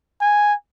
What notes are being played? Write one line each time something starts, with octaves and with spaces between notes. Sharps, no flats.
G#5